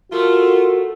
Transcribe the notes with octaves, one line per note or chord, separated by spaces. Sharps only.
A3 F4 F#4 A#4